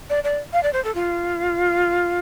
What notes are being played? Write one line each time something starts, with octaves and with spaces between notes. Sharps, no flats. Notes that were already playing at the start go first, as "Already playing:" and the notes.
D5
D5
F5
D5
C5
A4
F4